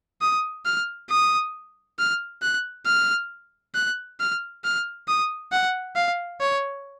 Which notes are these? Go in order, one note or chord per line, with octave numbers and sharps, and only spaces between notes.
D#6
F6
D#6
F6
F#6
F6
F#6
F6
F6
D#6
F#5
F5
C#5